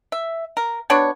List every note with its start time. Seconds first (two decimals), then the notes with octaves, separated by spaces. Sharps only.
0.12 E5
0.57 A#4
0.90 B3 D4 F#4 C#5